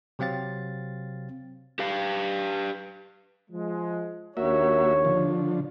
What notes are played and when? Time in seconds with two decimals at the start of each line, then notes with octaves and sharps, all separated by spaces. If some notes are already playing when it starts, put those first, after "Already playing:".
0.19 C3 F#3 C4 F5 A6
1.79 G4 B4 F5
3.51 F3 G#3
4.37 D#2 A#3 D4 F#4 C#5 E5
5.05 D3 F3